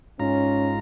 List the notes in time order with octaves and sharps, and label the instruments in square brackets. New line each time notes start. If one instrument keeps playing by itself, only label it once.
[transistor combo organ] G#2 F4 A#5 [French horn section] C#4